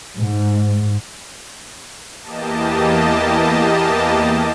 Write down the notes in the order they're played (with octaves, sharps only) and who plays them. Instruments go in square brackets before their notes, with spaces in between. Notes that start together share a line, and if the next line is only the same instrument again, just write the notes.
[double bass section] G#2
[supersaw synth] E2 E3 A#3 G4 D#5 A5